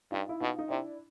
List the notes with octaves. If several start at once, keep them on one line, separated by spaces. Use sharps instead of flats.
G2 D#4 F4
E4
B2 D#4 F4
D#4
C3 D4 E4